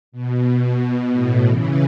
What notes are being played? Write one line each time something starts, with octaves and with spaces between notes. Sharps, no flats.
B2
B2
A2
C#3 E3